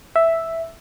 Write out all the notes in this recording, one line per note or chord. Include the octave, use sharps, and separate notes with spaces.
E5